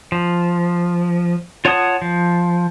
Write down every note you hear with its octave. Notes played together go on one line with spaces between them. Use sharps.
F3
F4 C#5 F#5 A5 D#6
F3